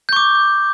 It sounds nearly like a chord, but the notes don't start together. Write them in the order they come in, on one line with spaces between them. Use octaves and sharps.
G6 C#6 D6